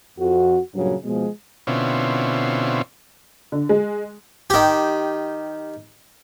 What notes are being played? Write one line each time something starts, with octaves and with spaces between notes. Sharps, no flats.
F2 F#4
G2 A#2 C#3 F#3
B2 F3 G#3
B2 D3 C4 C#4 E4 F4
D3
G#3
D#3 G4